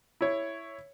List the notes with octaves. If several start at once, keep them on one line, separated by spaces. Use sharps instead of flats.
E4 C#5